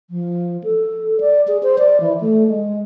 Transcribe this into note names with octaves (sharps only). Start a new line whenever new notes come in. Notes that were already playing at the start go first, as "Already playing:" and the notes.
F3
A4
D5
G#4
C5
D5
E3
A3
G#3